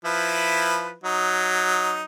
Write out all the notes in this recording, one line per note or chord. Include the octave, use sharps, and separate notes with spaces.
F3 E4 B4
F#3 D#4